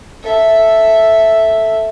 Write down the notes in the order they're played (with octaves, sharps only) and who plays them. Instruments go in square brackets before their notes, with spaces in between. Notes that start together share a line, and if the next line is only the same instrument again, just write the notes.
[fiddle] A4 E5